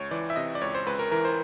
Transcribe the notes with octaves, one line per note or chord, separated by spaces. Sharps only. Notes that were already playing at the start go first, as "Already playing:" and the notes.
Already playing: C#2 C#5
E3 D5
E5
C3 D#5
D5
C#2 C#5
C5
C#2 B4
A#4
E3 A#4
C5